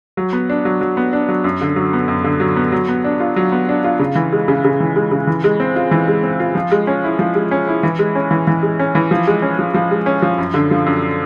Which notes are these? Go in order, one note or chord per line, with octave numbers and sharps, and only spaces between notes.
F#3
B3
D4
F#3
F#3
B3
D4
F#3
F#2
D3
F#3
B3
F#2
D3
F#3
B3
F#3
B3
D4
F4
F#3
B3
D4
F4
C#3
E3
G#3
C#3
C#3
E3
G#3
C#3
E3
G#3
C4
F4
E3
G#3
C4
F4
F3
G#3
C#4
E4
F3
G#3
C#4
E4
E3
G#3
C#4
E3
E3
G#3
C#4
E3
F3
G#3
C#4
F3
F3
G#3
C#4
F3
F#2
D3
F3
F#2